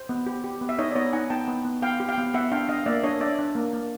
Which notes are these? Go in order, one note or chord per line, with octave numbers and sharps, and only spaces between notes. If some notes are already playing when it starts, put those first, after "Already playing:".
Already playing: C5
B3
G4
G4
B3
E5
D#4 C#5 D#5
D5
B3 C#5 D#5
D#4 F#5 G#5
B3 G5 A5
B3
B3
B3 F5 G5
G4
F5 G5
B3
B3 E5 F#5
D4 F5 G5
D4 D#5 F5
A#3 D5 E5
D4 C#5 D#5
D4 D5 E5
D4
A#3
A#3